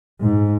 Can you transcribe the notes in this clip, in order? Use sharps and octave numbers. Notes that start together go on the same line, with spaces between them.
G#2